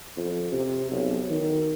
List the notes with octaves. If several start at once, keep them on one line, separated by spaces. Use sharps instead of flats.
F2
C3
B1
D#3